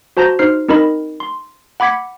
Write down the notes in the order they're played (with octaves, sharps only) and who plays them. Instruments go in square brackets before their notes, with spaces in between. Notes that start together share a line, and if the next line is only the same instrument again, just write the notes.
[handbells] F#4 C5 A5 A#5 G6 A#6
D#4 C5 F6 C7
C4 D#4 A#4 D#5 B5
C6
F#5 B5 D6 G#6 B6 C#7